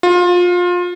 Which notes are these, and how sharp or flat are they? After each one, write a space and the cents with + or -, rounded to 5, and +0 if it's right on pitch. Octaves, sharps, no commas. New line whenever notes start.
F4 +25